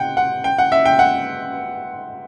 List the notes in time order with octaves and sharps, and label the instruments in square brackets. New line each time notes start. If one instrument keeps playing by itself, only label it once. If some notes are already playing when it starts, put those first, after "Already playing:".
Already playing: [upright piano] F#5 G5
F#5
G5
F#5
E5
G5
F#5